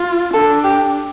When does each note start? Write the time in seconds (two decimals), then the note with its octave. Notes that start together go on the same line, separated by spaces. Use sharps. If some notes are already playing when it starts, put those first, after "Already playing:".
Already playing: F4
0.34 D4 A4
0.64 G4